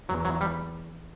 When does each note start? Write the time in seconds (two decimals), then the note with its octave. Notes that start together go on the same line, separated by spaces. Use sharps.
0.09 E2 F#3
0.25 F#3
0.41 G3